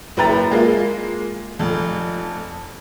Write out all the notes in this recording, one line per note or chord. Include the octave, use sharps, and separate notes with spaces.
F#1 E4 B4 G5 A#5 A6
G#3 A#3 F4
F1 F2